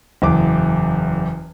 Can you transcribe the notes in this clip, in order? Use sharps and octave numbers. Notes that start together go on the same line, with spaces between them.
F#1 E2 D6